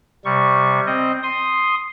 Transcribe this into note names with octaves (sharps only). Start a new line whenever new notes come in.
C3 G3 C#6
C4 D#5
C6 D#6